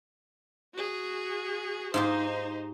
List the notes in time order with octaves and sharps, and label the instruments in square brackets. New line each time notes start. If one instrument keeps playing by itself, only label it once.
[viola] F#4 G#4
[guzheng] G#2 F4 G4 [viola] D#4 C5